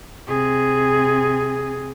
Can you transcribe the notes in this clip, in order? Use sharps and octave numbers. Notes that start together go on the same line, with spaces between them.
C3 G#4